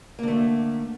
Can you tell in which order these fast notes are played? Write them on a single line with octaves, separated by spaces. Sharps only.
A#3 D3 A3